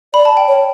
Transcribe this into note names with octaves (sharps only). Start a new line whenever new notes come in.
D5 B5
A5
G5
C#5